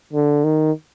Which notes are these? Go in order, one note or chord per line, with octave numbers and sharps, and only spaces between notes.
D3
D#3